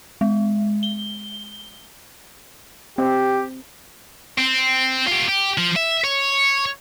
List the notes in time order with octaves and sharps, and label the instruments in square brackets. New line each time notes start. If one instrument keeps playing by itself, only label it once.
[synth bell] G#3
G7
[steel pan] C4 [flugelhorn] G4
[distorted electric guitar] C4
F4 G4
G4
F3
E5
C#5